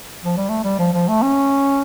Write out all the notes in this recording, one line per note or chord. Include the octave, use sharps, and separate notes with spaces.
F3
G3
A3
G3
F3
F3
A3
C#4